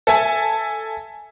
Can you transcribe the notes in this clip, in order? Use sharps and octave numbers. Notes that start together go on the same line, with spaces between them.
A4 E5 G#5